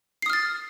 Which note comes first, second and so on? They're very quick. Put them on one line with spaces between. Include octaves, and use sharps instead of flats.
C7 D#6 F6 A6